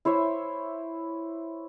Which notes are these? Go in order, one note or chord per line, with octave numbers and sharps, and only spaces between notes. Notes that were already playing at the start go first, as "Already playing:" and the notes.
E4 C5 C#5 E5